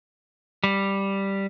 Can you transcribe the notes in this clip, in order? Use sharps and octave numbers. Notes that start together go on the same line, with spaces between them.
G3